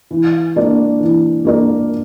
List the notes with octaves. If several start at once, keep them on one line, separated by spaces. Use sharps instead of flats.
E3
A#3 D4 A#4 D5
E3
A#3 D4 A#4 D5